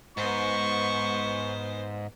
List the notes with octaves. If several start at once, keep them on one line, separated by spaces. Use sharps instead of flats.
G#2 B3 C5 C#6